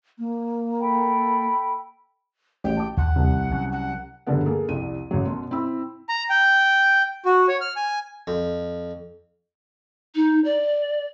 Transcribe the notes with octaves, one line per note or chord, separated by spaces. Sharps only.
A#3
A4 G5 B5
A1 G5
A5 D6
D#2 F#5
C2
F#3 C#4
F#5
E1 G2 D3 F3 B3 F#5
A#3 G#4 A4
C2 F2 E4 D#7
A1 F#3
F#2 B2 C6
C4 E4 B5 E6
A#5
G5
F#4
C#5
F6
G#5
F2
D#4
D5